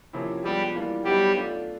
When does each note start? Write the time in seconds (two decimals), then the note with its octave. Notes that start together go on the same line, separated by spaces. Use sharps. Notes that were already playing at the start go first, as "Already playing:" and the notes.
0.13 C3 F3 A#3 C#4 E4
0.44 F3 G3 G#3 B3 D4 G4
0.74 E3 G3 A#3 D4 F4
1.05 F#3 G3 B3 D#4 G4
1.36 A3 D4 F4